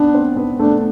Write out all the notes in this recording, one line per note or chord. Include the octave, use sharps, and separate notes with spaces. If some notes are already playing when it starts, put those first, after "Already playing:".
Already playing: B3 D4 B4
C4 C5
B3 B4
A3 D4 A4